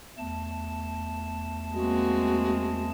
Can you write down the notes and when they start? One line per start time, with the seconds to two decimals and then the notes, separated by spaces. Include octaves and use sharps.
0.18 E2 A3 A5
1.74 G#3 A#3 C4 F#4